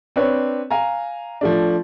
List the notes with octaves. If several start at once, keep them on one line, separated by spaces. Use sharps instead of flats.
C4 D4 B4 C#5
F5 G#5 A#5
F3 A3 D4